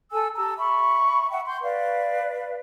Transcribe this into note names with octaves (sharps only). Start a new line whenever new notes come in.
A4 G#5 E6
G4 A5 A#5 E6
E5 B5 C#6
E5 F#5 G5
C6 G6
B4 D5 F5